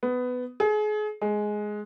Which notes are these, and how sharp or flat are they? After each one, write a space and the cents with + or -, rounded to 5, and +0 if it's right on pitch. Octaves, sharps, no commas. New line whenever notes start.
B3 +15
G#4 +35
G#3 +10